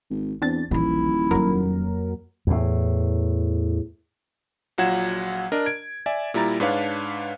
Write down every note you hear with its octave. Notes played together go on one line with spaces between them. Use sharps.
G#1
E2 C4 D4 A6
D#1 A#1 E3 F3 E4
F2 F#3 A#3 A#4
E2 A2
A#1 F#3 F4 F#5 G#6 E7
D4 A#4 D#5
G#6 D7
D5 E5 G#5
A#2 G3 E4 A#5 A6
G#2 D4 B4 C#5 F5